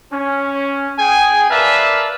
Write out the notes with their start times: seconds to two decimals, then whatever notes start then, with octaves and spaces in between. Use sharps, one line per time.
0.13 C#4
0.99 G#4 G5 G#5
1.50 A#4 B4 D5 E5 F5 A5